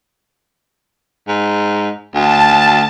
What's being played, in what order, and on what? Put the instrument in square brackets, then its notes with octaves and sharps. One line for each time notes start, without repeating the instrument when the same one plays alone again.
[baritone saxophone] G#2
[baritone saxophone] D2 [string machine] A5